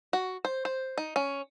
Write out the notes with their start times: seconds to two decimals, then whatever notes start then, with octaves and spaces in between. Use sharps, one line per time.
0.13 F#4
0.45 C5
0.65 C5
0.98 D#4
1.16 C#4